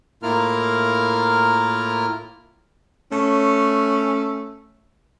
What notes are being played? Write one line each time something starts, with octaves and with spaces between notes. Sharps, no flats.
A2 A#3 E4 F4 A#4 F6
A3 C#4